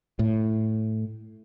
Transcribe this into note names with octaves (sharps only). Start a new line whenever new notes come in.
A2